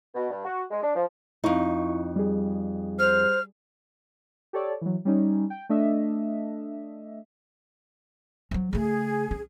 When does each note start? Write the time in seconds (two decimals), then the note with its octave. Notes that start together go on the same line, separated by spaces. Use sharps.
0.15 B2
0.30 G2
0.45 F#4
0.71 G#3
0.83 D4
0.95 F3
1.44 F2 D#4 E4 C#6
2.16 G3 G#4
2.99 C5 F6
4.53 G4 A4 C#5 D5
4.81 E3 F#3
5.05 G3 C#4 D#4
5.50 G5
5.69 A3 D4 D#5 E5
8.51 F3 F#3
8.73 C#3 A3 G#4
9.31 C#4